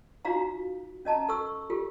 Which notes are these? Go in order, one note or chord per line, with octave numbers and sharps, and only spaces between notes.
D#4 F4 F#4 F5 A#5
C#4 D#5 A5 A#5
A4 C#6 E6
F4 G4 A4